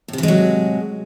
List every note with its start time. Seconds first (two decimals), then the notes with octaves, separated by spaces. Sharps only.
0.08 A2
0.13 C3
0.18 E3
0.23 G#3
0.28 F#3